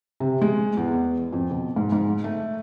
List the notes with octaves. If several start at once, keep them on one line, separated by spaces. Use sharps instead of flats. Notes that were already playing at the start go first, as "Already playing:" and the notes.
C3
G#3
E2
F2
B2
G#2
G#2
A3